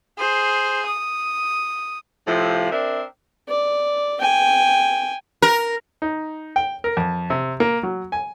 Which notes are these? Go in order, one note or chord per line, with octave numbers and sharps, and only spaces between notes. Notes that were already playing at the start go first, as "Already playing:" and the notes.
G#4 C5
D#6
A2 C3 F3
C4 D4 A#4 E5
D5
G5 G#5
A#4
D#4
G5
A#4
F2
C3
A#3
F#3
G#5